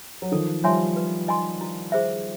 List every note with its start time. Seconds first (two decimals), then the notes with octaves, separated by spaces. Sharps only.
0.22 F#3
0.32 D#3 F3 A4
0.64 F3 G3 C#5 E5 G#5 C6
0.96 B4
1.28 D#5 G#5 C6
1.61 E4
1.92 G#4 C5 E5